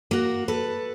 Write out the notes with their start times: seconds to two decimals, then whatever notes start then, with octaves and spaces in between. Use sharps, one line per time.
0.11 A#3 F#4
0.48 A4 B4